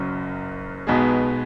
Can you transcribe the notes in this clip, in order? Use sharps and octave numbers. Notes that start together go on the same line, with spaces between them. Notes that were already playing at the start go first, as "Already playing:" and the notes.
Already playing: F#1 F#2 F#3
B1 B2 G#3 B3 G#4